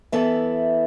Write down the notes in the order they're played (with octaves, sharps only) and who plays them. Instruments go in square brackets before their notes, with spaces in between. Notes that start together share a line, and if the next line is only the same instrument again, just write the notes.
[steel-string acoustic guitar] E3 B3 E4 A4 E5